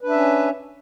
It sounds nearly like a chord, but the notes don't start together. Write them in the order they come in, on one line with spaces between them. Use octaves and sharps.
B4 D4 E5 C#4